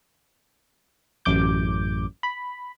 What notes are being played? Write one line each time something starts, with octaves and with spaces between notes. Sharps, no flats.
A1 F#2 D6 G6
B5